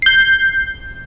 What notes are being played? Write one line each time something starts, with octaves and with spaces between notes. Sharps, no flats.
G6 C7